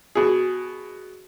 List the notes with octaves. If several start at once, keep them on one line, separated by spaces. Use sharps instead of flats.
B2 G#4